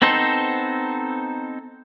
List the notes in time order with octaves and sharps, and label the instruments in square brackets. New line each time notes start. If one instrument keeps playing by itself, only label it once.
[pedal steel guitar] B3 C4 D#4 A4 C5